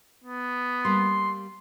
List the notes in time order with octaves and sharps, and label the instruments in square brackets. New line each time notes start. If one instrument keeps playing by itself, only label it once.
[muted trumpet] B3
[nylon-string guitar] G3 A#3 [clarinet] C6